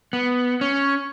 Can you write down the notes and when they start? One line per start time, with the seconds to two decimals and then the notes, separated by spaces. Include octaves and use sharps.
0.13 B3
0.61 C#4